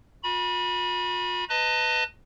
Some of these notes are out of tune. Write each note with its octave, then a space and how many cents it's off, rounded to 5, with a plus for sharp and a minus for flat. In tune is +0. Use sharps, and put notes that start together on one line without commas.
F4 +45 B5 -30
B4 +10 D#5 +10 A5 +40